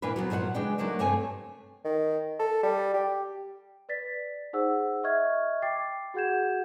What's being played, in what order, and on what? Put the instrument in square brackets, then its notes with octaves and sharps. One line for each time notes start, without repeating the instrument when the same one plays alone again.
[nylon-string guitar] A#2 E3 A#3 D4 B4
F#3 G3 B3 C4
A#2 F3 F#3 C5 F#5
C#3 G#3 D4 B4 D5 G5
F#3 A3 A#3 D4 D#4
G2 C3 A3 C4 C#5 G#5
[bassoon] D#3
A4
G3
G4
[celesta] B4 D5 A6 B6
D#4 G#4 C5 F#5 E6
D#5 E5 C#6 F6 G#6
G5 D6 A6 C7
F#4 G#4 F#5 G6 G#6 E7